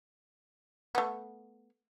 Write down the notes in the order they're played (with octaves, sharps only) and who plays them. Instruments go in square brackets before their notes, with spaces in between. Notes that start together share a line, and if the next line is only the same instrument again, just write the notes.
[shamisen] A3 B3